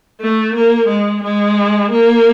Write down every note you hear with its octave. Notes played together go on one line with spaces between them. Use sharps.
A3
A#3
G#3
G#3
A#3